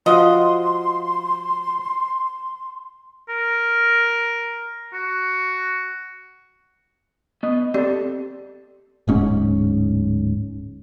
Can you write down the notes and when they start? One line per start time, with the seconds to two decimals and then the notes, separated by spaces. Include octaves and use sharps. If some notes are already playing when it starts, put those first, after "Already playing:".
0.06 F3 F4 F#4 D#5 C6
3.29 A#4
4.93 F#4
7.43 B3 D#5
7.74 C4 G4 A4 D5
9.08 D1 G#2 C#4